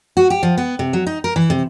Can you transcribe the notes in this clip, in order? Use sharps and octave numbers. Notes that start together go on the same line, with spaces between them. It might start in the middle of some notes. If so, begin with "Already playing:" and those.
F#4
G4
F3
B3
C3
F#3
D#4
A#4
E3
C3